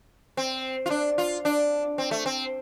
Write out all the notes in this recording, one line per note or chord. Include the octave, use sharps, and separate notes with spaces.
C4
F4
D4
F4
D4
C4
A3
C4